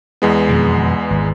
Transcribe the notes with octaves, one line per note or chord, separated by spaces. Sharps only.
E2 G#3 B3
F2 B2 D#3
G#1